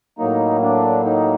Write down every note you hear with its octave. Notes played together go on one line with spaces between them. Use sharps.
A2 F#3 A#3 D#4
D4
D#4